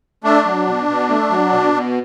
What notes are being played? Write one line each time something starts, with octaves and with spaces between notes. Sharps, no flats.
A3 D4
F#3
B2
B2
A3
F#3
B2
B2